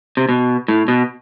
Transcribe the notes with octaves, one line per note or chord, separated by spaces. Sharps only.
C3
B2
A2
B2